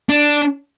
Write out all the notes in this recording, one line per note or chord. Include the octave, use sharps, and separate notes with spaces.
D4